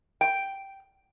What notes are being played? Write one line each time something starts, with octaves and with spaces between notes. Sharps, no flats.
G5